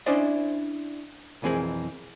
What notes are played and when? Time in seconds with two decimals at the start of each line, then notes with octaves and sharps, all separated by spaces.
0.06 C#4 D4 E4 C5 D5 D#5
1.42 B1 F2 E3 C4 G#4 A#4